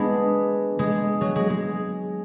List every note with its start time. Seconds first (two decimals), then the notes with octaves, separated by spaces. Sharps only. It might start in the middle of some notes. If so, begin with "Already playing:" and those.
Already playing: G#3 B3 D4
0.79 G#3
1.21 F#3
1.36 G#3
1.50 G#3